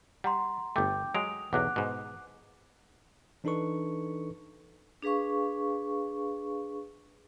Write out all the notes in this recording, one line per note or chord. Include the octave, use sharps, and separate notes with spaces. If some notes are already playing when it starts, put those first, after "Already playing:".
G3 F#5 A#5 C6
G1 A3 G5 D6 G6
F#3 G#3 D#6 D7 F7
B1 E2 F#3 F#5 D6 F#6
G#2 B2
E3 D4 D#4 A4 B4 C#6
D4 G#4 B4 F5 C#6